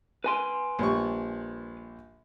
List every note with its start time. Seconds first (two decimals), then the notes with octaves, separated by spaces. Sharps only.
0.24 B4 G#5 C6
0.79 A#1 G3 C#6